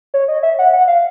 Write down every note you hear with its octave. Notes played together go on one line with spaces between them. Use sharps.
C#5
D#5
E5
F#5
F#5
F5